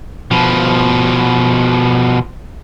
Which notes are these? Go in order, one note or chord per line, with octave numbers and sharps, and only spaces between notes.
B2 F3